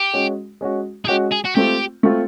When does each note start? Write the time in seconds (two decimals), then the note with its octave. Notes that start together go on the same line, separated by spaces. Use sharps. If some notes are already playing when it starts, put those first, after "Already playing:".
Already playing: G4
0.13 G#3 C#4 F#4
0.61 G#3 C#4 F#4
1.05 G#4
1.08 G#3 C#4 F#4 G4
1.32 G#4
1.45 F#4
1.56 A3 C4 F4 G4
2.03 A3 C4 F4